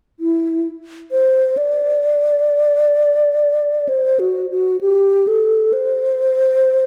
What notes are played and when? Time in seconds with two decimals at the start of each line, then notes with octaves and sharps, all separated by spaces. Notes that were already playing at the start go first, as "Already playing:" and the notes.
0.20 E4
1.12 C5
1.57 D5
3.89 C5
4.20 F#4
4.50 F#4
4.81 G4
5.27 A4
5.73 C5